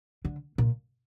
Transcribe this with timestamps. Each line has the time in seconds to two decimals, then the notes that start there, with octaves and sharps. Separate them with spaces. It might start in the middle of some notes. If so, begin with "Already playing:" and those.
0.25 D3
0.58 A#2